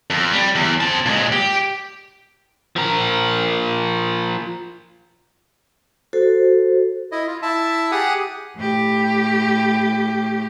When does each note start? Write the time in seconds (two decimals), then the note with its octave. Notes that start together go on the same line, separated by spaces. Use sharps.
0.10 F2
0.33 G3
0.55 E2
0.81 C4 A5
1.06 A#2 G#3
1.32 G4
2.76 F3 A#4
6.13 F#4 A4 C5
7.12 E4 D#5
7.27 F4
7.42 E4 E5 A5
7.92 G4 G#4 F#5 D#6
8.56 A2 G4